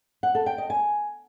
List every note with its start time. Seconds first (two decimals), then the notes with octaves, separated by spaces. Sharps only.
0.23 F#5
0.35 A4
0.46 G5
0.58 D#5
0.70 G#5